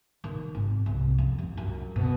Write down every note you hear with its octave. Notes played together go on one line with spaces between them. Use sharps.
D#3
G#1
C2
F2
D#2
F#2
B2